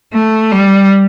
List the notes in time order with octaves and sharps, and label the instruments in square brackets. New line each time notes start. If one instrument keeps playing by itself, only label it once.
[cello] A3
G3